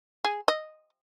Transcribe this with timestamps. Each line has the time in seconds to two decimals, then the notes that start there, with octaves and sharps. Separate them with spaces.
0.25 G#4
0.48 D#5